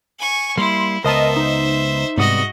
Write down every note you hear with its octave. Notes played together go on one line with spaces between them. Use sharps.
G#5 C#6
G3 A#3 E4 C6
C#2 B3 A#4 C5 D#5 E5 A5
D#4
G#2 C3 G3 B3 F#4 D#5 D#6